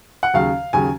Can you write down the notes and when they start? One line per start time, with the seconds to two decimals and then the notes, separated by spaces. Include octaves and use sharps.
0.23 F#5
0.34 D#2 C#3 F#3 F5
0.73 D#2 C#3 F#3 G#5